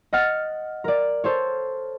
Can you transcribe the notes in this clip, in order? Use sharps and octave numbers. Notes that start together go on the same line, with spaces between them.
D#5 F#5 F6 A6 C#7
A#4 D5
A4 C5 C#5